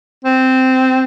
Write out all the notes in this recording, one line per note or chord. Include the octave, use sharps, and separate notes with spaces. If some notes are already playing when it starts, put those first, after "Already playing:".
C4